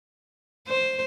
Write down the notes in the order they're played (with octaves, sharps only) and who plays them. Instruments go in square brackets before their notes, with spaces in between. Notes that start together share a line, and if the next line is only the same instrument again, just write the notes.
[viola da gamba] C5